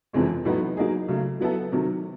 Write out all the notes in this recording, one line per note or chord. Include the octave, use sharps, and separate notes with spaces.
F2 C3 E3 G#3 C#4
A2 F#3 B3 D#4
F#3 A#3 D#4 G#4
C#3 F#3 A3
F#3 B3 E4 A4
C3 D#3 F#3